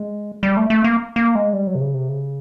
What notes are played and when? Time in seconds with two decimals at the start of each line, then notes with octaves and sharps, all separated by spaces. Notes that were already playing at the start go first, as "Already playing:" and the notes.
Already playing: G#3
0.43 G3
0.57 A3
0.70 A3
0.84 A#3
1.16 A#3
1.35 G#3
1.53 G3
1.67 F#3
1.75 C3
1.81 C#3
1.94 C3
2.09 C#3